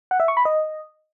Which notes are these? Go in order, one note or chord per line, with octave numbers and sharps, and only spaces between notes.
F#5
E5
C#6
B5
D#5